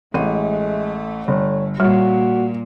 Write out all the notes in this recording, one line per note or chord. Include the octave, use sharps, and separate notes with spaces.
A1 G#3 A3 D#7
G1 C#5
A#2 G3 F#4 C#5